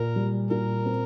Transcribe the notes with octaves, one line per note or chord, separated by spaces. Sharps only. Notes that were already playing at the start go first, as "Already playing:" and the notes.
Already playing: A#2 A#4
G3
A#2 A#4
C4